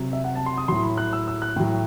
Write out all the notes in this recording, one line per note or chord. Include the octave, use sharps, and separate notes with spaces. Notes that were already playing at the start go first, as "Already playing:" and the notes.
Already playing: C3 F#3
E5
F#5
A5
C6
D#6
A2 F#3 C6
B5
F#6
E6
E6
F#6
A2 F#3 G5